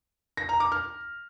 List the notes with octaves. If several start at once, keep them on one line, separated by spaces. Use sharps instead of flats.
A#6
A#5
D6
F6